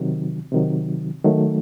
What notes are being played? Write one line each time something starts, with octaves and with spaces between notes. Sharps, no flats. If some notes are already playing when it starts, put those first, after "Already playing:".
Already playing: C3 D#3 F#3
C3 D#3 F#3
D#3 F#3 A3